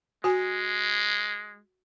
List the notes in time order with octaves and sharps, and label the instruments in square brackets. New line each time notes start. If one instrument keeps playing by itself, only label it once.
[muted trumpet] G#3 [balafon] F#4 G#5